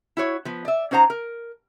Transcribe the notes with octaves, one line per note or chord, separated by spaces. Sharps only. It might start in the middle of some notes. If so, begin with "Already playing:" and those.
E4 F#4 C#5
F3 B3
D5 E5
C#4 D#4 C5 F#5 A#5
A#4